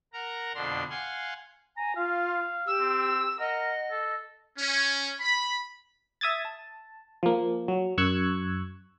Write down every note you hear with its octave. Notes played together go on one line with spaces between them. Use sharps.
A#4 F#5 A#5
F2 B2 D3 D4 C6
F5 F#5 G#5 C6
G#5 A#5
F4 F5
G4 E6
C4
A#4 D#5 F#5
A4
C#4
B5
E5 D#6 G#6 A6
A5
F3 A#3
F#3
F#2 C#6 E6 F#6 G#6